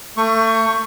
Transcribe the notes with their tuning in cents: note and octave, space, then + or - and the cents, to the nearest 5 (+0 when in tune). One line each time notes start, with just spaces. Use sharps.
A3 +30 C#6 +0